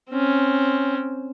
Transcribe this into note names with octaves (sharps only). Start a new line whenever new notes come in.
C4 C#4